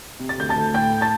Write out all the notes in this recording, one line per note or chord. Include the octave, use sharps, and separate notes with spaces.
C3
A6
D2 G6
A5 A6
D2
A2 G5 G6
A5 A6